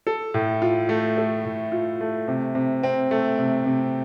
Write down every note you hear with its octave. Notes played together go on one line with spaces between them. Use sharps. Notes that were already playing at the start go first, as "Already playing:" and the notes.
A4
A2
F4
A3
A4
A2
F4
A3
C3
C3
C4
A3
C3
C3